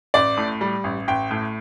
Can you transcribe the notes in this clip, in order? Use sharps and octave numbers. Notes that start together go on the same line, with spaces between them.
A1 D5
A2
G3
A1
A1 G5
A2